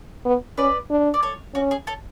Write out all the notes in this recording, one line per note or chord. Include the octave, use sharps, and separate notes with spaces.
B3
C#4 B4 D5
D4
D5
A4 C#5
C#4 F#4
G#4
A4 C#5